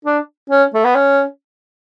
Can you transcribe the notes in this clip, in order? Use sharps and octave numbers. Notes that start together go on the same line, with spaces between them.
D4
C#4
A3
B3
C#4